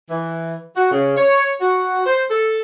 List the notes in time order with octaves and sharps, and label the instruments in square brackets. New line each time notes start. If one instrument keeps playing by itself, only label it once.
[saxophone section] E3
F#4
C#3
C#5
F#4
C5
A4